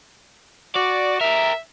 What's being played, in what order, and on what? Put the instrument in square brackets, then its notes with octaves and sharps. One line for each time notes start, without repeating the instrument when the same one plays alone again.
[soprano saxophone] F#4 [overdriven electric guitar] D5
[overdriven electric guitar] G4 A#4 [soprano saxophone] E5